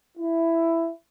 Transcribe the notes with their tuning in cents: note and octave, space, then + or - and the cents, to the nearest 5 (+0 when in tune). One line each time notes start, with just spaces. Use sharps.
E4 +10